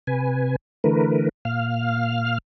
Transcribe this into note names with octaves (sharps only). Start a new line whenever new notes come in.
C3 B4 G#5
D3 E3 A3 A#4 B4
A#2 F5 F6